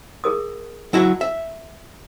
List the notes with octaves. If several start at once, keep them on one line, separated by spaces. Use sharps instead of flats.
G#4 A#4 D#6
F#3 E4 F#4
E5